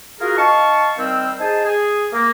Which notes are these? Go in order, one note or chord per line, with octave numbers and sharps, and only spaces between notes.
F4 F#4 G#4 A#4
D#4 F5 A5 C#6
D#3 G3 C4 C5 E6
D#4 G#4 C5 G#5 A5
G#4
A#3